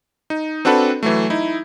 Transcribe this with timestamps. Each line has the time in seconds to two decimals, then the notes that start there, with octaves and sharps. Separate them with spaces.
0.30 D#4
0.65 C4 D4 F#4 A4 B4
1.03 E3 F#3 A3
1.30 D#4 E4